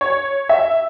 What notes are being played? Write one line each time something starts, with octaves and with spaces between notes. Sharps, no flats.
C#5
E5